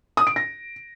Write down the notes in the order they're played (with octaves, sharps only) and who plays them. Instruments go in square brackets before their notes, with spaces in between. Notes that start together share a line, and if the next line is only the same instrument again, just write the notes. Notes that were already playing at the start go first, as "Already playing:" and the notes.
[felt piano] D#6
D7
A#6